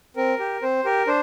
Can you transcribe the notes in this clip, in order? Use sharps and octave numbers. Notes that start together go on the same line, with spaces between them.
C4 A#4
G4
C4 C5
G4 A#4
D4 C5